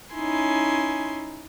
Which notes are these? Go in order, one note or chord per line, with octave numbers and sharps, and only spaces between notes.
C#4 D#4 E4 G#5 C6